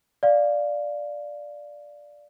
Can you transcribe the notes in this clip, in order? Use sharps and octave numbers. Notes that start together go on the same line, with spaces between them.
D5 F5